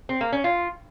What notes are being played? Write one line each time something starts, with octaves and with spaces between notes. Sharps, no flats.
C4
A#3
C#4
F4